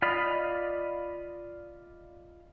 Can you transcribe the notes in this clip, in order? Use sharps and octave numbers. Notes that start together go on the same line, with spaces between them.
F4 D5 D#5 F5 B5